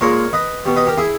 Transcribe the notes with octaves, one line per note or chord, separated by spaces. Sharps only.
A#2 G#3 A#4 C#5
B4 D#5
B2 G3
B4 D#5
G4 A#4
E4 G#4